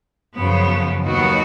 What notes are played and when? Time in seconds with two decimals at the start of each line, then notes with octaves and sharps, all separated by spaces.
0.36 F#2 C#3 F3 B3
1.04 D#2 D#3 F#3 B3 F#4